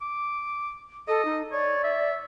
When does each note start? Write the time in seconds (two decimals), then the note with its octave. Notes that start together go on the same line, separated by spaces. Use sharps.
0.02 D6
1.08 A4 D#5
1.25 D#4
1.52 C#5 D5
1.84 E5